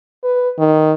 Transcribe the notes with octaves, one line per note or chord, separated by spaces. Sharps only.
B4
D#3